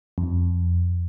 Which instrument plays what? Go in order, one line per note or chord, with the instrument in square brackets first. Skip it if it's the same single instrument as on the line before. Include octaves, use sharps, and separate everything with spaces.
[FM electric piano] F2